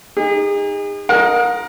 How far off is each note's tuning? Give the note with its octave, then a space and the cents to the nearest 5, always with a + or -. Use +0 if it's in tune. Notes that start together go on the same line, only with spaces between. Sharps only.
D#4 +0 G#4 -40
A#4 +15 D#5 +0 F#5 -45